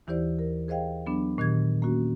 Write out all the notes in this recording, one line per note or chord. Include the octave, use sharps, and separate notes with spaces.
D#2 E3 E4 G4 C5 D5
A#4
G#4 C5 D#5 F5 G5
F#3 B3 D4
A#2 D#3 G4 G#6
A#3 C#4 F#4